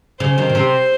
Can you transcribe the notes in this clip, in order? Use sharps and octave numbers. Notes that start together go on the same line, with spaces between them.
C#3 C5
C3 D#3
A#2
C3